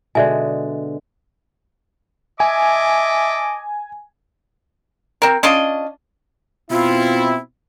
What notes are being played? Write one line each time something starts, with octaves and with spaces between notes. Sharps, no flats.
B2 D3 G#3 D5 E5 G#5
D#5 E5 G#5 A5 D6
C4 A#4
C#4 D4 F4 D#5
B2 C4 E4 F4